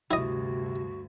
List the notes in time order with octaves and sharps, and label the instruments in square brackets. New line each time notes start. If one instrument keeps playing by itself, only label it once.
[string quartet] D2 G2 [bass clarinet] C3 [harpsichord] E4 D#5 [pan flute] F#4